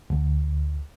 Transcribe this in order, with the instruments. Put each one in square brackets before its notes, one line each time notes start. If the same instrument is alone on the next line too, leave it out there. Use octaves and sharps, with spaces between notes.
[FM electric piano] D2